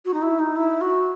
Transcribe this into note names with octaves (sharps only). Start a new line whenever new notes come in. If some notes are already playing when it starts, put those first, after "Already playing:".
F#4
D#4
E4
D#4
E4
F#4